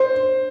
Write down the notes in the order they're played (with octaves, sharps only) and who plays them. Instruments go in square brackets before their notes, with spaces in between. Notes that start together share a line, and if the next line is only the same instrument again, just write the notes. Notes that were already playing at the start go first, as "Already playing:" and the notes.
Already playing: [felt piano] C5